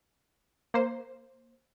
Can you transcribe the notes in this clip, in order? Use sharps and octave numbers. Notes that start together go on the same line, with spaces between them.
A#3 C5